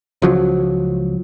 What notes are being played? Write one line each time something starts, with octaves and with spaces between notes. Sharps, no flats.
C#2 F3 F#3